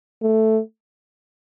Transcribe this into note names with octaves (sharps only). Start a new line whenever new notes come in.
A3